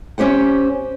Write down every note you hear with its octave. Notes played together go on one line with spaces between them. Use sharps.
C#4 G4 C5 F#5